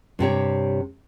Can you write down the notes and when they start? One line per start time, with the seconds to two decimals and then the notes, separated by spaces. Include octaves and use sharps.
0.19 G2 C3 G4 C#5